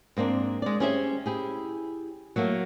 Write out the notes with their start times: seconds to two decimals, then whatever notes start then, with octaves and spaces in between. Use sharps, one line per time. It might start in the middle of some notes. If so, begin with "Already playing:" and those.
0.17 G#2 A#3 C4 D4
0.62 G#3 D5
0.80 C#4 G4 G#4 C5 D#5 E5
1.26 E4 G4 G#4
2.36 F#3 A3 A#3